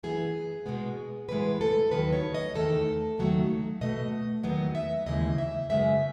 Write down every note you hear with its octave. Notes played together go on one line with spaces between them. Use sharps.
F#2 E3 B3 G#4
B2 G#3 B3
A2 E3 G#3 B3 B4
A4
D#2 D#3 F#3 B4
C#5
D#5
E2 D#3 A3 A4
D#2 D#3 F#3 A3
B2 A3 D#5
E2 D#3 F#3 B3 D#5
E5
D#2 C#3 E3 G#3 D#5
E5
F#2 C#3 G#3 B3 E5